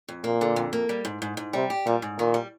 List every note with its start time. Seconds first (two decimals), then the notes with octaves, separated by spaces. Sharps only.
0.08 F2
0.24 A#2 A#3
0.41 D3
0.56 F2
0.73 A#3
0.89 G3
1.05 G#2
1.22 G#2
1.37 G#2
1.53 C3 G3
1.70 G4
1.86 A#2 G3
2.02 G#2
2.18 A#2 D#3
2.34 G3